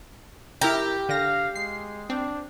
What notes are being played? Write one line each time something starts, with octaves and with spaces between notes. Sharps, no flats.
E4 G4 A#4 A#5
D3 F5 A#6
G#3 C7
C4 D4